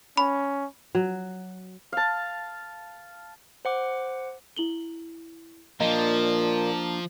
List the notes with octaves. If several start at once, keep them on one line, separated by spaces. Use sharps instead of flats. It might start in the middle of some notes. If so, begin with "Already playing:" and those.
C#4 B5
F#3
F5 A5
C5 F#5 D6
E4 F#7 G7
A#2 F3 A#3 D4 D#5 G7